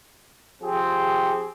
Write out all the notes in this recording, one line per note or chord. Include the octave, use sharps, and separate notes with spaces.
F3 C4 G4 G#4